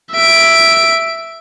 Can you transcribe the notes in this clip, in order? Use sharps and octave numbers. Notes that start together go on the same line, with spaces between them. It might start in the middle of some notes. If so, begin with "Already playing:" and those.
E5 D7